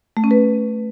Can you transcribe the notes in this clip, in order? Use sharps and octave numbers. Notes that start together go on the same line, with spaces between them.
A3
C#4
B4